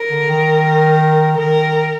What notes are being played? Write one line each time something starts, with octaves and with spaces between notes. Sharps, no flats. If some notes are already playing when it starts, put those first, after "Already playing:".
Already playing: A#4
D3
D#3
D#3 A#4